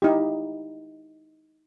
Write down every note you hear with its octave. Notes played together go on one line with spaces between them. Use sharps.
D#4 E4 G4